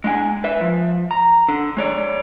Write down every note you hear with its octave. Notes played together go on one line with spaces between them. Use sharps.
G#3 D4 G5 G#5
B4 E5
F3
A#5
D3
G#3 C#5 D5